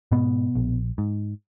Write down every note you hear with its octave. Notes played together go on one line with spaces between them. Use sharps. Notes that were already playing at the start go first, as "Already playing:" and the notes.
G#2 B2 B3
A#1
G#2